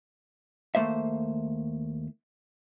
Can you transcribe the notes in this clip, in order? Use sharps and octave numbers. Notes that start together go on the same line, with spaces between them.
D#2 A3 A#3 C5 E5